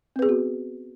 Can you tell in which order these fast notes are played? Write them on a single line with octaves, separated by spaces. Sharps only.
C4 B4 G#4 B3 F#4